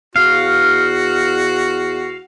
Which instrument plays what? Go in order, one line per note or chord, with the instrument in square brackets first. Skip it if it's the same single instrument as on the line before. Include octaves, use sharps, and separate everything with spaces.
[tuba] E2 [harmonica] F#4 [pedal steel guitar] F5